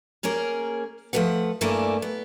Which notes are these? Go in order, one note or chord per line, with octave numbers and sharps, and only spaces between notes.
A#3 C#4 G#4 A#4
F3 G#3 A3 B4 F#5
G2 A3 A#3 E4 D5 G#5
B3